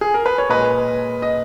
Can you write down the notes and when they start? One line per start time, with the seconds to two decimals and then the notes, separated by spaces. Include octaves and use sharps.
0.01 G#4
0.14 A#4
0.26 B4
0.38 C#5
0.49 A#2 G#3 B4 D#5
1.22 D#5